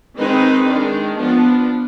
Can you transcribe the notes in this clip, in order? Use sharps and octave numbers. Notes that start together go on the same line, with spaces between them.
D#3 G#3 C4 D#4 B4
D#3 G#3 D4
F3 B3 D4